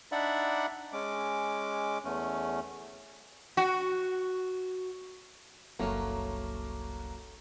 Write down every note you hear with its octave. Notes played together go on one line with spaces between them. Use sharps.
D4 D#4 D5 E5 F#5 B5
G#3 C#4 D6
E2 A3 C#4
F#4
F#1 C2 F#3 A3 A#3 C#4